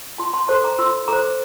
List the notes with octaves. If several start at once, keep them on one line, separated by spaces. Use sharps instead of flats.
F4 A5 C6
A5 C6
A4 C5 A5 C6
A#5 D6
F4 C6 E6
A4 C5 A#5 D6